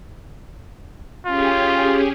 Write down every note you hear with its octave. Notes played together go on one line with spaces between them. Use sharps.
C#4 F4 G4 G#4